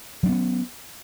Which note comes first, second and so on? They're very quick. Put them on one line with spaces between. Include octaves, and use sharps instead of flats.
F#3 D4 B3 C#4